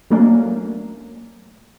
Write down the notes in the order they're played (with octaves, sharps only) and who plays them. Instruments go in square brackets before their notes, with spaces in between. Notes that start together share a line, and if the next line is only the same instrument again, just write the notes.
[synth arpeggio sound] F#3 A3 A#3 C#4 D4